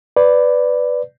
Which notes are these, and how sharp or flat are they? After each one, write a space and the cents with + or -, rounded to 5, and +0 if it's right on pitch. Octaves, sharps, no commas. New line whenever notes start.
B4 +10 D5 +0